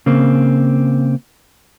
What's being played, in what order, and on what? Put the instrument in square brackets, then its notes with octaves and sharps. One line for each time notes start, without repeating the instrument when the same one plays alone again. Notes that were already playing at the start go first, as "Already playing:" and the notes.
[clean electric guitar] C#3 A#3 C4